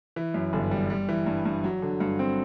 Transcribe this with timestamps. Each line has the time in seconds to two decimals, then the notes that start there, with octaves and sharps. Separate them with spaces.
0.16 E3
0.34 F#2
0.53 G1
0.71 G3
0.90 G3
1.09 E3
1.26 G2
1.45 G2
1.64 F#3
1.82 D3
2.00 G2
2.19 C4